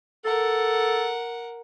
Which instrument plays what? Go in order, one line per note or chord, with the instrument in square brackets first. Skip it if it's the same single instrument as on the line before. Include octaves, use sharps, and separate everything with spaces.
[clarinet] A4 [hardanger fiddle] A#4 F#5